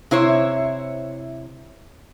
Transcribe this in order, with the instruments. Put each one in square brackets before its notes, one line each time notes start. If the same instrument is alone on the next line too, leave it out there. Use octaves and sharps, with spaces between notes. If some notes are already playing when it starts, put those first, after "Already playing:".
[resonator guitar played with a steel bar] C3 E4 C5 C#5